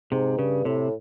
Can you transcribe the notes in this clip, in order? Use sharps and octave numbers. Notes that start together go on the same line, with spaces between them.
G#2 C3
G2 C#3
A2 C3